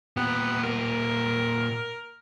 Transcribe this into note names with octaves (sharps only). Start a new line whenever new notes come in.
A#2 B3 G4
A#4